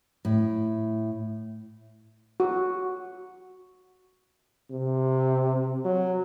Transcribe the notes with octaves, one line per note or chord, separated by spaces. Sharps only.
A2
F#4
C3
F#3